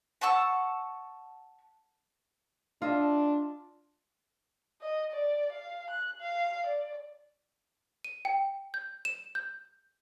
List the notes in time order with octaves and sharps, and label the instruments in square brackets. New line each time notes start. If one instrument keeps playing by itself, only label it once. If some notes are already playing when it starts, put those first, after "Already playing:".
[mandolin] F#5 A5 C#6 E6
[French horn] D4 [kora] F4 D#5 E5
[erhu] D#5
D5
F5
F#6
F5
D5
[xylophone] D#7
G5
G6
E7
G6